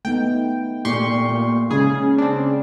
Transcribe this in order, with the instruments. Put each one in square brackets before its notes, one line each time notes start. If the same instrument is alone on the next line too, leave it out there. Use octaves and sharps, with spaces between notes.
[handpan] A3 B3 D#4 [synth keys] G5
[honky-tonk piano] A#2 [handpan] A3 [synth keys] G4 C6 C#6
[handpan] A#3 F4
[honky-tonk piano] C#3 [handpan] G#3 [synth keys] G#4
[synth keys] C4 D4